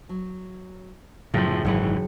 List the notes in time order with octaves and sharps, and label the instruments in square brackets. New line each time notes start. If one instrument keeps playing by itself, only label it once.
[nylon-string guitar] F#3
[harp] F#1 [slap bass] A2 F3 [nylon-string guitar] D3 B3
[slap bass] G#1 E3 [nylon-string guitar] G#2 F#3 D#4 [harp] C#7